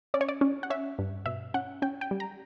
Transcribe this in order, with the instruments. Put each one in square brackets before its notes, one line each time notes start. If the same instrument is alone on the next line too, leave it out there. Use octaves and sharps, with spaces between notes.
[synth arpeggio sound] C#4 D5
C#5
D5
C#4
F#5
C#4 E5
G2
B2 E5
C#4 F#5
C#4 G5
G5
G3
A#5